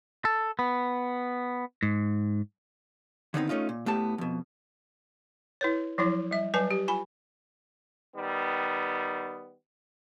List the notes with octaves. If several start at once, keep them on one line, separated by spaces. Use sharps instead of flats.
A4
B3
G#2
D3 D#3 B3 C4 D4 D#4
A3 C#4 D#4 F4
A#2
A2 A3 B3 G4 A5
F2 B2
E4 B4 C#5
F3 F#3 E4 C#5
G3 E5
F#3 G3 B4 G#5 A5
G4
F4 G#5 B5
D#3 G3 B3